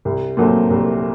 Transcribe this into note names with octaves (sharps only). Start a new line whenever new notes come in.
C2
A#2 F#3 A3 C4
C2